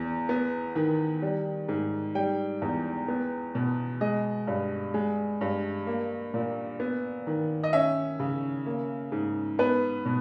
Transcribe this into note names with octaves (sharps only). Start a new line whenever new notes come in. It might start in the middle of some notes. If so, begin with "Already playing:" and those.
Already playing: E2
B3
D#3
G3
G#2
G3 G5
E2
B3
B2
G#3 D#5
G2
G#3
G2
A#3
A#2
B3
D#3
D#5
C#4 E5
C#3
A#3
G#2
B3 B4
B2